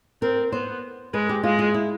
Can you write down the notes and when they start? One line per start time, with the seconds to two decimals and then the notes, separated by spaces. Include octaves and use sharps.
0.22 C4 A#4
0.52 B3 C5
1.14 G#3 B4
1.29 G4
1.44 G#3 F4
1.59 F4
1.74 E4